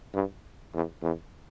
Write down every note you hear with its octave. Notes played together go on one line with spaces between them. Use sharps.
G2
E2
E2